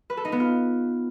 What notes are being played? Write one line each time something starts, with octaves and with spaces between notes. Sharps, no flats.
B4
A4
D#4
B3
F4